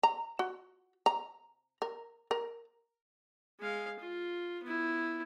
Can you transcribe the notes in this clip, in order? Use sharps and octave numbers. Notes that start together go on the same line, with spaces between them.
A#5
F#4
A#5
A#4
A#4
G#3 F5
F4
B3 E4